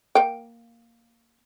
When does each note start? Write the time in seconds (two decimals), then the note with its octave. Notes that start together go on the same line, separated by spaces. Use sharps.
0.15 A#3 G5